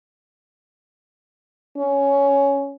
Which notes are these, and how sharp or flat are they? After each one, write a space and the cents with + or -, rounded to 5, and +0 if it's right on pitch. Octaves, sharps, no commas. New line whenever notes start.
C#4 +10